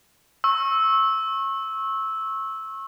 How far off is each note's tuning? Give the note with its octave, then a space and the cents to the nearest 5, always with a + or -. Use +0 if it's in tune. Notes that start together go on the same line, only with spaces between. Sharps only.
C#6 -30 E6 -10